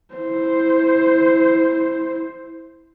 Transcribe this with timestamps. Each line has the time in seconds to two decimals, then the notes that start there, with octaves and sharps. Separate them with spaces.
0.14 E4 C5